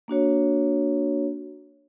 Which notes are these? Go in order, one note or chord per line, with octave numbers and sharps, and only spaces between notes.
A#3 D4 F#4 C#5